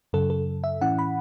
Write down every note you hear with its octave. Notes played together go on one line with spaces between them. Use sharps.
F#2 C#3 F#3 A4
A4
E5
A2 E3 C#4 E4 F#5
B5